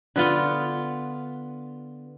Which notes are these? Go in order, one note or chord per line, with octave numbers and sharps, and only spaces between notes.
D3 B3 F4